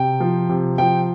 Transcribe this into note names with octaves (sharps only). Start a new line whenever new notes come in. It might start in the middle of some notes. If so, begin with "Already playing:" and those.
Already playing: C3 G5
F3
C3
F3 G5